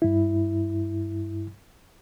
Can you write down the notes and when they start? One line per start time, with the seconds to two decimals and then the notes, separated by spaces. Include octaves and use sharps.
0.02 G2 E4